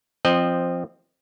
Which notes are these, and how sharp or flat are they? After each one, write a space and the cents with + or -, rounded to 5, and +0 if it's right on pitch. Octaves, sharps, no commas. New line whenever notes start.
F3 -10 C4 +0 D#5 -20